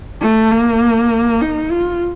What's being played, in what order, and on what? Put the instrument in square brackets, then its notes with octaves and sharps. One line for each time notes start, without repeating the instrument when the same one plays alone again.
[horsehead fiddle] A3
A#3
D#4
F4